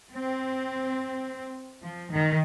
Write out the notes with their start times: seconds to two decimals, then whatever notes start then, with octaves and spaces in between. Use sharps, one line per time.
0.13 C4
1.82 F3
2.10 D#3